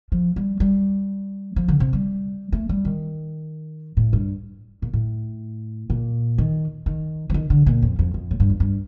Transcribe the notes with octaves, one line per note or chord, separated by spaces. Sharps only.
F3
G3
G3
F3
D3
C3
G3
A3
G3
D#3
A2
G2
A#2
A2
A#2
D#3
D#3
F3
D#3
D3
A#2
F2
F2
F2
A2
G2
F2
G2